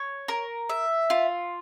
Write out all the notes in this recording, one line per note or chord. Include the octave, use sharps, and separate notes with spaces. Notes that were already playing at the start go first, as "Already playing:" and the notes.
Already playing: C#5
A#4
E5
F4